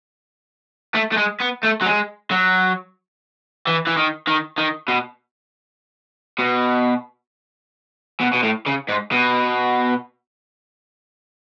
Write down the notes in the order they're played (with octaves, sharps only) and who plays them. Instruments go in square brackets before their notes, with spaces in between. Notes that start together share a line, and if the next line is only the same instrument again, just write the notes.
[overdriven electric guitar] A3
A3
G#3
B3
A3
F#3
G#3
F#3
E3
E3
D#3
D#3
D#3
B2
B2
B2
B2
A2
C#3
G#2
B2